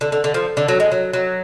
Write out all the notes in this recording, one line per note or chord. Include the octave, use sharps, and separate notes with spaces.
D3
D3
D3
F3
D3
F#3
G#3
F#3
F#3